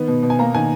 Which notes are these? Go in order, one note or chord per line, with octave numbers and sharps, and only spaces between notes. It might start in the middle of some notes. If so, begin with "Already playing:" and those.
Already playing: D#3 B3
B2
B2
G#5
A#3 A#5
D#3 G#5